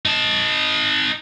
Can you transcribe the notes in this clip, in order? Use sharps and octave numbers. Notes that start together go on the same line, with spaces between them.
D#4 A5